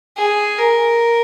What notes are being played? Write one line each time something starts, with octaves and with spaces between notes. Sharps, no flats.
G#4
A#4